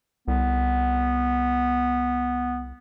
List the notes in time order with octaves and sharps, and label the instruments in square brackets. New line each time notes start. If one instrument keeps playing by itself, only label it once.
[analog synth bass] C2 [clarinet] B3